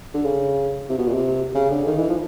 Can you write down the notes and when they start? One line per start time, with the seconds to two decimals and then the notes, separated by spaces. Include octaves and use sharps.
0.14 D3
0.25 C#3
0.90 C3
0.98 B2
1.07 A#2
1.14 C3
1.55 C#3
1.70 D3
1.87 D#3
1.98 E3
2.09 F3